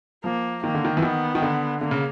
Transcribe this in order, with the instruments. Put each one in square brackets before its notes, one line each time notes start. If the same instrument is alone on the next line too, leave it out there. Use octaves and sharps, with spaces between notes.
[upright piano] F3 [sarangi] A#3
[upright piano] D#3 [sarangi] A#3
[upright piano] D3
D#3
E3
[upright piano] D#3 [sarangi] B3
[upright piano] D#3
D3
[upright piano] D3 [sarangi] A#3
[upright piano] C#3